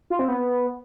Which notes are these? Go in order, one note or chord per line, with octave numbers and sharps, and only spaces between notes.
F4
C4
B3